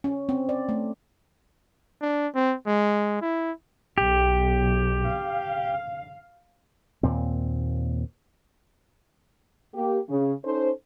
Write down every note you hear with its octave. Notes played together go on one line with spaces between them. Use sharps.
C#4
C4
D5
A3
D4
C4
G#3
E4
B1 G4
F5
D#2 A#2 C4
A#3 G4
C#3
C#4 D#4 A4 C5